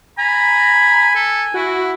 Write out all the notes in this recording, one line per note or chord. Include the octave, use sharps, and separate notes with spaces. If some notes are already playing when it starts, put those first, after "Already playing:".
G#5 A#5 B5
A4
E4 F#4